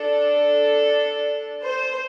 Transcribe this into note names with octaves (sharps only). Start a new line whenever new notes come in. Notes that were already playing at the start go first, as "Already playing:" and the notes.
Already playing: D4 A4
C5